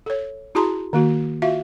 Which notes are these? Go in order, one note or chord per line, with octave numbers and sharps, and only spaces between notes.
A4 C#5
E4 F#4 G#4 A5 A#5 C6
D#3 A#3 F#4
F4 F#4 E5 F5